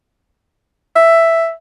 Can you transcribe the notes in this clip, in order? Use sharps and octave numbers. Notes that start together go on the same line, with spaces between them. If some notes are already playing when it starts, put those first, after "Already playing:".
E5